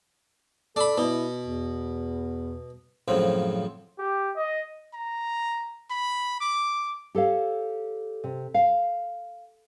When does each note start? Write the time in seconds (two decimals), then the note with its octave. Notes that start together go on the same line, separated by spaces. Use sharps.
0.76 D4 A4 B5
0.98 B2 E4
1.45 E2
3.08 F#2 A2 C#3 F3 C4
3.98 G4
4.36 D#5
4.94 A#5
5.91 B5
6.41 D6
7.15 G4 A4 C#5 F5
8.24 C3
8.54 F5